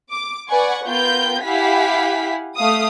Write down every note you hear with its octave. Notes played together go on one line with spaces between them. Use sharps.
D6
B4 D5 F#5 G#5 C#6
B3 F4 A#4 B4 G5 G6
E4 G4 F5 F#5 G#5 B6
A3 F5 D#6